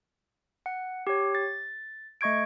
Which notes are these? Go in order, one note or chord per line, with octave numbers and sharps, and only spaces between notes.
F#5
G4 C#5
A6
A3 D#5 C#6 G#6 D7